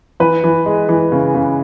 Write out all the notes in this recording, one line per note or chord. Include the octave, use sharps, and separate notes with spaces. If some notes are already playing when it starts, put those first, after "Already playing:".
E3 B4
E3
G#3
E3
C#3
C#3